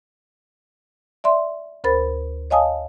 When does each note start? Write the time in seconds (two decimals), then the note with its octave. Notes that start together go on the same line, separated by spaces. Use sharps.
1.24 D5 E5 C6
1.84 D2 A#4 C5 B5 A6
2.50 C#5 D#5 F5 G#5 A5 D#6